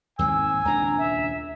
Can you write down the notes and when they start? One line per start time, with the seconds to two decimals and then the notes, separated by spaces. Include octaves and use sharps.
0.19 D#2 G#2 C4 G#5 E6
0.65 D#1 C#2 D4 A#5
0.98 E5